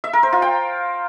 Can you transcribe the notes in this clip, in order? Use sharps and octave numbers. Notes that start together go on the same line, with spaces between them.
E5
A#4
C5
F4
G5